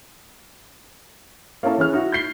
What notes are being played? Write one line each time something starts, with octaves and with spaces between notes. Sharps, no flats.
A#3 C#4 E4 A4
E3 C#4 G#4 F6
D#4 E4 F#4
G6 B6 C7 G7